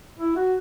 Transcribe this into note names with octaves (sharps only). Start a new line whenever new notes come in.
E4
F#4